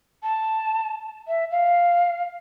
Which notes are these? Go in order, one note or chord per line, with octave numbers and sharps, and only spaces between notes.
A5
E5
F5